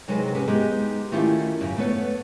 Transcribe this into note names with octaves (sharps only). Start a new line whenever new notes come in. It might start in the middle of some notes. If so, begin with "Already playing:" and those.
C3 F#3 G#3 D#4 G#4 B4
C#4 G4 G#4 B4
G#3 B3 D#4 G4 G#4
D#3 A3 C#4 E4 F4 G4
F#2 C#3
A3 B3 B4 C#5